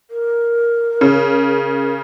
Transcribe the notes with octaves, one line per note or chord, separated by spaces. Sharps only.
A#4
C#3